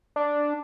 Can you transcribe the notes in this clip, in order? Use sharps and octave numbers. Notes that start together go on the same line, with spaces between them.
D4